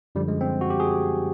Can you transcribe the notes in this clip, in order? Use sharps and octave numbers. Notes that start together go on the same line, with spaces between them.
F#2 D3 F3 G3
G#3
C4
F#4
G4
G#4